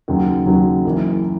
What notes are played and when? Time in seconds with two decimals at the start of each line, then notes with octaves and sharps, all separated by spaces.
0.08 D#2 C#3 F#3
0.46 D#2 C#3 F#3
0.85 F#1 F#2 E3